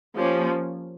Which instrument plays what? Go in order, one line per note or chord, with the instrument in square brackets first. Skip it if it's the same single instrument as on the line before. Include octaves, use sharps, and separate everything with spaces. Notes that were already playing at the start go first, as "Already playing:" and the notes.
[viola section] F3 A#3 C#4 G4